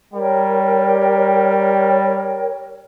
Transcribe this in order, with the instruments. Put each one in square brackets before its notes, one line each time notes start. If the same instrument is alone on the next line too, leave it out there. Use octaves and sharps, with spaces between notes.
[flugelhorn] G3 [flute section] A#4 C#5 G5